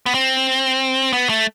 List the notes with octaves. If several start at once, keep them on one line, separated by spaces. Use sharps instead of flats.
B3
C4
B3
A3